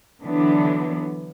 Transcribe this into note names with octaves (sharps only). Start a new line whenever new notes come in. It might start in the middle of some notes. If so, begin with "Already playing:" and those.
D3 E3 F#3 B3 D4